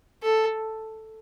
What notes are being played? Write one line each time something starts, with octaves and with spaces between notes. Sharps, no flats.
A4